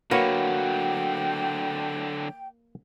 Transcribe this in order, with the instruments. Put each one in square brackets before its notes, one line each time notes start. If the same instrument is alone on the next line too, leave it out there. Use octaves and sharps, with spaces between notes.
[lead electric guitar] D3 F#3 [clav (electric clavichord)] A#3 B4 C#5 [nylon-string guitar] F#4 [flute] G5